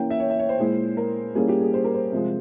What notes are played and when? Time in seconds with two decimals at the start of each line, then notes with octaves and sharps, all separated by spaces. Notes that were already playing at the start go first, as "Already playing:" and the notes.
Already playing: E3 A#3 C#4 G5
0.10 E5
0.20 C#5
0.30 E5
0.39 C#5
0.49 C5
0.58 A#2 G#3 E4
0.97 A#4
1.35 A#2 G3 A#3 C#4 E4 G#4
1.49 G4
1.61 G#4
1.74 C5
1.84 A#4
1.94 C5
2.12 C3 F3 G#3